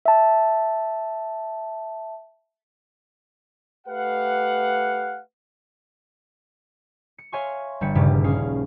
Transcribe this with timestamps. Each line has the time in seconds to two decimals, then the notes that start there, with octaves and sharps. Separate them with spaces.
0.06 E5 A5
3.87 A3 G4 B4 F5 F#5
7.18 C#7
7.32 C#5 E5 F5 G#5 C6 C#6
7.81 G1 G3 C#7
7.95 D#1 A#1 G2 C#3 D6 B6
8.24 C#4 G#4 F5